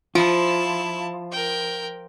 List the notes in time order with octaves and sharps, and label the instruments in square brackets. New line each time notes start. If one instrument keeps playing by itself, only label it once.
[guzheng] F3 [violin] E4 A5 [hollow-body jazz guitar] F4
[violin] A#4 G5